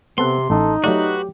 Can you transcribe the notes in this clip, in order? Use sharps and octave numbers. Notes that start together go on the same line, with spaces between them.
C3 B3 C4 A4 F#5 C6
A1 D#4 A4
F#3 A3 F#4 G4 B4 D5